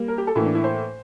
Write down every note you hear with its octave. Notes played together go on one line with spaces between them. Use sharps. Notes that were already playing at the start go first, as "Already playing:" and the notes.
Already playing: G3 A#3
A#4
G4
A4
A2 E3 A#3 E4
D4
E4
C5